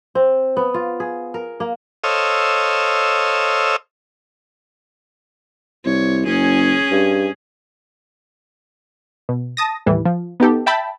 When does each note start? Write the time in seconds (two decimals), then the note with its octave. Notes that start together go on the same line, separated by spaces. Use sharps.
0.15 C4
0.57 B3
0.74 F4
1.00 G#4
1.34 A#4
1.60 A#3
2.04 A4 C5 C#5 D#5 F5 E6
5.85 C2 C#5
6.26 F#1 C#4 G#4
6.91 G2
9.29 B2
9.57 A5 D#6 A#6
9.86 D#2 A2 E3 G3
10.05 F3
10.40 B3 D#4 G4 A4
10.66 E5 G5 A5 B5